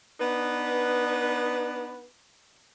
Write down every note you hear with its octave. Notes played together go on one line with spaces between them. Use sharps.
B3 D4 D#4 B4